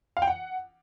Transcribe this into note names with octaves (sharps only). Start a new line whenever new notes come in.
F5
G5
F#5